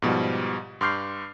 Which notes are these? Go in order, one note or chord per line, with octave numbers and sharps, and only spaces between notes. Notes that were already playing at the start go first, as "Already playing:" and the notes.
G#2 B2 F3 G3
G2 C6 D6 F6 G6 C7